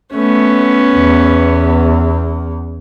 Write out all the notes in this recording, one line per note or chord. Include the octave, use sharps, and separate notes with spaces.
A3 B3 C#4
E2